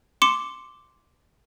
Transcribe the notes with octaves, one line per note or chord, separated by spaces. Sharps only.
C6 D6 C#7 E7